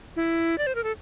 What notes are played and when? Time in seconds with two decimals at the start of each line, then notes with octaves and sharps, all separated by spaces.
0.16 E4
0.58 D5
0.67 C5
0.75 A#4
0.84 A4